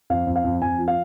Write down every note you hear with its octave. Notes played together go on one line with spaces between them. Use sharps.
F2 F5
F2
F5
F2
F2 G#5
F3
F5